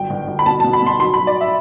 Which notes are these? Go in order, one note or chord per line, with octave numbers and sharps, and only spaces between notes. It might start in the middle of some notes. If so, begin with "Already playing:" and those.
Already playing: G1 F#3 G5
G1
G1
B5
B2 A5
A5
B2
B5
B2 C6
F#3 C6
B5
F#3
D5
E5